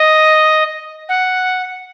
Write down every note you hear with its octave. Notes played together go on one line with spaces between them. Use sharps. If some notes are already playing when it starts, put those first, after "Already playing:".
Already playing: D#5
F#5